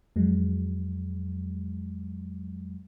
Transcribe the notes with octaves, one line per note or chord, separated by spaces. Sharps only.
F2 F#3 G#3